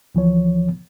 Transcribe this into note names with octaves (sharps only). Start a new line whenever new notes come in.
D2 E3 F3 C#5